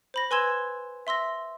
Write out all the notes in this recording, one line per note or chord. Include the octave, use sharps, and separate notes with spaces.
C5 B5 A#6
B4 G#5 C6 E6 G#6 E7
E5 C6 E6 A#6